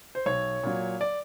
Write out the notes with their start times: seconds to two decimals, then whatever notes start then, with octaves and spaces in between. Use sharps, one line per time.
0.15 C5
0.26 B1 C#5
0.63 A#2 F#3
1.01 D5